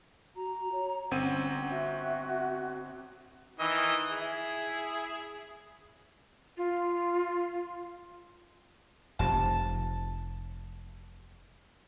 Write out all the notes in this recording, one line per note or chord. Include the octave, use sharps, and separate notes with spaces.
F#4 A#5
C#5
G1 C4 C#4 F#5 D#7
F#4 E5
D#3 E3 D#5
E4 G#4
F4
F1 C3 F3 A5